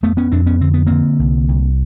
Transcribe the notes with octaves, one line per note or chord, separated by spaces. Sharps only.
F2 A3 B3
B3 C#4
F2 C4 D4
B3 C#4
D3 C4
B3
D3 A#3 C4
C2
C2